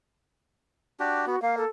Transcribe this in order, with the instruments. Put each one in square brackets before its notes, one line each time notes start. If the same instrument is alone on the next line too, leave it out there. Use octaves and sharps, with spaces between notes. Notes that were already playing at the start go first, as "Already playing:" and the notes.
[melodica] D4 F#4 G4
[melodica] B3 [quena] F#4
[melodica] A#3 [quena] F5
[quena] A4